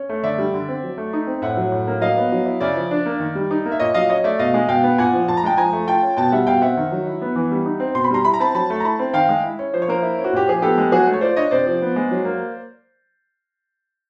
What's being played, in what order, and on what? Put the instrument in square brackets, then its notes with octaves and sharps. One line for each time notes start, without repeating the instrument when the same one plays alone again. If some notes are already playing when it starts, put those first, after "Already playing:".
Already playing: [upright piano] C#4
A3
D3 D5 E5
G3
D3
C4
F#3
A3
D#4
C4
A2 E5 F#5
F#3
A2
A#3
F#3 D#5 F5
B3
F#3
E4
C#3 D5 E5
F3
D4
A#3
D#3
G3
D#4
A#3
E5
A#2 C#5 D#5
F#3 D#5 F5
C#4 C#5 D#5
A3 D5 E5
B2 D#5 F5
G#3
B2 F5 G5
B3
A#2 F#5 G#5
F3
A#2 A5
A#5
G#3 G5 A5
F3 G#5 A#5
A3
F4 G5 A5
C#4
B2 G5 A5
G3 E5 F#5
B2 F5 G5
C4 E5 F#5
D#3
F#3
E4
B3
E3
G3
D#4
C4
B2 C6
B5
G3 A#5 C6
E4 B5
A#5
C4 A5 B5
F#3 A5 B5
A3
A#5
E4 A5 B5
C4
D#3 F5 G5
G#3
E4
C#4
F3 C5
C#5
A#3 A#4 C5
E4
C#4
F#4
A#2 G4
F3 G#4
B3 G4 A4
G#3
F#3 F#4 G#4
A3
C#5
F4 C5 D5
D4 C#5 D#5
C3 C5 D5
F3
B3
G#3
F#3
A#3